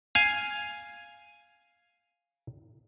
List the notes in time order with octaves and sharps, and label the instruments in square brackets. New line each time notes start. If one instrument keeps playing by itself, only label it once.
[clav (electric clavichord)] F5 G#5